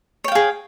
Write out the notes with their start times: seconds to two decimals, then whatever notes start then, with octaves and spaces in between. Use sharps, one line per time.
0.24 C#5
0.28 G5
0.32 F5
0.35 G#4